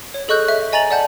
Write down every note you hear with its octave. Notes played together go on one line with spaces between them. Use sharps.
C#5
G#4 A4 D#5 C#6 F#6 G6
E5
D#5 G#5 A#5 A6 F7 F#7
D5 E5 F#5 A5 G6